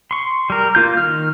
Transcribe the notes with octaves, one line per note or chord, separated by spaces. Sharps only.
C6 C#6
G3 A#4
A#3 F4 G6
D#3 F6